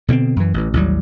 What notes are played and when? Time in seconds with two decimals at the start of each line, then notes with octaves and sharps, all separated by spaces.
0.08 B2 D3 B3 C4
0.36 F#2 E3
0.54 A1 E3
0.74 A1 D#2 F#3 G3